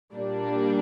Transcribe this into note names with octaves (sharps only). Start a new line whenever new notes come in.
A#2 G3 A#3 D4